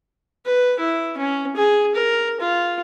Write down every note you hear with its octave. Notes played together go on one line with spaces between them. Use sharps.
B4
E4
C#4
G#4
A#4
F4